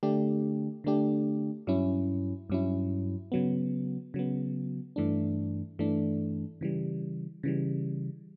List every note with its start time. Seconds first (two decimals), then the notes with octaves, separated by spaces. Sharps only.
0.03 D3 A3 D4 G4
0.84 D3 A3 D4 G4
1.67 G2 F#3 C#4 E4
2.50 G2 F#3 C#4 E4
3.32 C#3 F#3 B3
4.14 C#3 F#3 B3
4.96 G2 E3 A3 D4
5.79 G2 E3 A3 D4
6.61 C#3 E3 G3
7.43 C#3 E3 G3